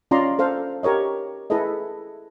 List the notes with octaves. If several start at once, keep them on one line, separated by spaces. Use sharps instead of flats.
C#4 F4 D5 D#5 A#5 C6
A4 C5 F5
G4 A#4 C#5 D#5
E4 G#4 A4 B4 D#5